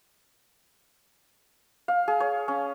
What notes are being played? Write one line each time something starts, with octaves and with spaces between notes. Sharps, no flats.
F5
G#4
C#5
C#4